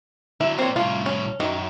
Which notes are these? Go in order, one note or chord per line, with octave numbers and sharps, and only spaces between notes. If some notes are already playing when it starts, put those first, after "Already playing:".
D3 F#3 E4
A#3 C4 D4 C#5
C2 A2 F4
C#4
F#2 D#3